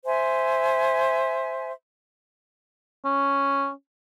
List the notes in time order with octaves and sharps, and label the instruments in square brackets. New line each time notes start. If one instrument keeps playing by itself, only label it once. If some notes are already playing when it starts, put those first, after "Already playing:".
[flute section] C5 E5 G#5
[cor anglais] C#4